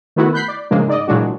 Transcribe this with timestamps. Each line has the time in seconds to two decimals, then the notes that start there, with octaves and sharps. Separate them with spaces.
0.16 D#3 A3 B3 E4 F#4
0.33 B5 F#6 G6 B6 C7
0.48 D5
0.71 A2 C#3 F3 G#3 A#3 D4
0.88 G#2 D5 D#5
1.07 A#2 E3 F#3 G#3 D4 F#4